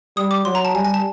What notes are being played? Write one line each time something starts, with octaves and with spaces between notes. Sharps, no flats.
G3 D#6
D6
F#3 C6
A#5
A5
G3 G#5
G#5
A5